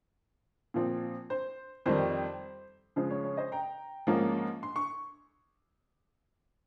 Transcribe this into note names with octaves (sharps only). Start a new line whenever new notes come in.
A#2 F3 C4
C5
F2 D#3 G3 C5
C#3 F3 G#3 C5
C#5
C#5
C5 D#5
G5 A#5
G#2 F3 A#3 C#4
C6
C#6